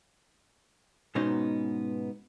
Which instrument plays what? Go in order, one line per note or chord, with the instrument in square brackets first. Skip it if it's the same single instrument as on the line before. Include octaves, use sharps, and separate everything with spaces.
[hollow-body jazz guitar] G#2 B2 B3 C#4 D#4 C5